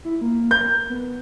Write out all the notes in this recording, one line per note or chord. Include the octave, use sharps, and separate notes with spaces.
E4
A#3
A#4 G6
B3